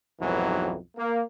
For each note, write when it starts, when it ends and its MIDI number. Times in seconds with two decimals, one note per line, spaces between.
0.21 0.77 35
0.21 0.77 41
0.21 0.77 44
0.21 0.77 52
0.21 0.77 54
0.97 1.22 58